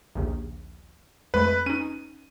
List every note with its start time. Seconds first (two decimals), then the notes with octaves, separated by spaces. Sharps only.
0.15 A#1 D#2 C#3
1.34 F2 G#3 A3 B4
1.66 C#4 D#4 D#7